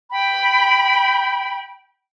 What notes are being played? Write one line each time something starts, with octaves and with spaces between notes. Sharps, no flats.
G5 B5